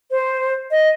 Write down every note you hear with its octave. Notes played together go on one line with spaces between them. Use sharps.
C5
D#5